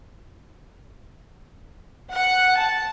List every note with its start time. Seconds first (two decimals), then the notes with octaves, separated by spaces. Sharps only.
2.13 F#5
2.58 A5